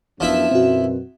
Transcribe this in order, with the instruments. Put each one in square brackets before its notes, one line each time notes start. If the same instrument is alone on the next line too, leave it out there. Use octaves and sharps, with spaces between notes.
[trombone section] F#2 B3 D4 [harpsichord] F3 E4 E5
[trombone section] F#2 B2 [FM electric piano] C4 F#4